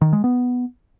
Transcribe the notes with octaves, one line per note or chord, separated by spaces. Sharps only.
D#3
G#3
B3